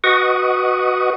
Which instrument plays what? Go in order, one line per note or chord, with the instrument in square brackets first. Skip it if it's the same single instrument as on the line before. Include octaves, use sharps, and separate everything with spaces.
[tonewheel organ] F#4 B4 D#5 F#5 C#6 D#6